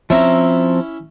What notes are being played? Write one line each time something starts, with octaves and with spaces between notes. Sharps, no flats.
F3 C4 C#4 E4 A#5